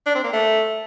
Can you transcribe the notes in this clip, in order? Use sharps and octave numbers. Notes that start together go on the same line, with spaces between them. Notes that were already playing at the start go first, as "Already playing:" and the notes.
D4
C4
A#3
A3